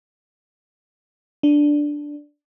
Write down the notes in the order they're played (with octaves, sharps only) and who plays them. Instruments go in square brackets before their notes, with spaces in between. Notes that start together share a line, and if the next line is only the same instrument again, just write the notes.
[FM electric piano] D4